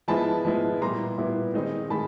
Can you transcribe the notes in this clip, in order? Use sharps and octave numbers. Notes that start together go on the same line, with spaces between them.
F3 G#3 B3 E4 A5 B5
F3 G#3 B3 E4
A#2 G3 B3 E4 A#5 C6
A#2 G3 B3 E4
D#3 G#3 C4 D#4
D#3 G#3 A5 B5